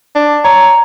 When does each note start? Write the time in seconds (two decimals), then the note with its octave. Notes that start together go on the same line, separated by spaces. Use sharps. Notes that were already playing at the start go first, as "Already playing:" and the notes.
0.15 D4
0.44 C#5 A#5